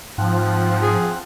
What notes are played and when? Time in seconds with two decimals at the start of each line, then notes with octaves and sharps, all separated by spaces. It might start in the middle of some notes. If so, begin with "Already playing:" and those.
0.18 G#2 F3 C4 F#5
0.82 G#4